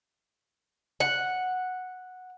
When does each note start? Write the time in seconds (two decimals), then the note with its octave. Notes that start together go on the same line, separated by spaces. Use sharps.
1.00 F#5